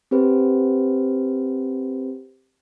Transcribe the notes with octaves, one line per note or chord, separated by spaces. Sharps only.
C4 G4 B4 C5